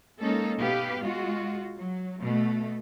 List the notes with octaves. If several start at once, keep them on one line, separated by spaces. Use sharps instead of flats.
G#3 A#3 C#4 D#4 A4
B2 B3 G4 B4 F5
G#3 F4 F#4
F#3
B2 A3